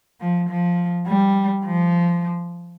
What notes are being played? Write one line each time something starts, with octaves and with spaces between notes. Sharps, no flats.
F3
F3
G3
F3